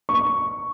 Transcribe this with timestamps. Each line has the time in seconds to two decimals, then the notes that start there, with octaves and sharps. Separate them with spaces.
0.09 C#6